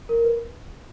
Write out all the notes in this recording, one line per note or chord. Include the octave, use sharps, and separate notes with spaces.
A#4
B4